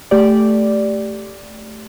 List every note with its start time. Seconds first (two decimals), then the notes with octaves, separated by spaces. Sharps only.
0.11 A3 G4 D5